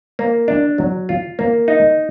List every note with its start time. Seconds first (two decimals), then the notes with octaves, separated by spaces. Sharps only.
0.19 A#3
0.48 D4
0.78 F#3
1.09 F4
1.39 A#3
1.68 D#4